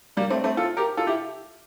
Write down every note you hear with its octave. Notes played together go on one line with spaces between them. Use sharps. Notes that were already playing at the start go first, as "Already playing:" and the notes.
G3 A#3
A3 C4
A3 C4
F4 A4
G4 A#4
F4 A4
E4 G4